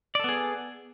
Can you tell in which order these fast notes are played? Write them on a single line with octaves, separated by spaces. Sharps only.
D5 A4 B3 G#4